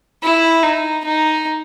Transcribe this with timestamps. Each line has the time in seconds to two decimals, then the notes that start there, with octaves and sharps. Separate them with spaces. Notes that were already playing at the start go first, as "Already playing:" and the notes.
0.23 E4
0.63 D#4
1.04 D#4